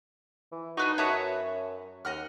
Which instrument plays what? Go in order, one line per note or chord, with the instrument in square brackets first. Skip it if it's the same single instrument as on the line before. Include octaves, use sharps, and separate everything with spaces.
[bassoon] E3
[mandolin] D4 B4 C#6 [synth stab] D#4 [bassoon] F#4
[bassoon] F#2 [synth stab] F#4 B4 C#5 [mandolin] E5 A5 D#6
[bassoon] D#2 [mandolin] D#5 F#5 F6